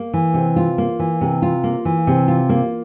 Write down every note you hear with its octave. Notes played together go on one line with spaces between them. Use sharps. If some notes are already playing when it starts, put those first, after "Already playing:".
Already playing: A#3
E3
C3
F4
A#3
E3
C3
F4
A#3
E3
C3
F4
A#3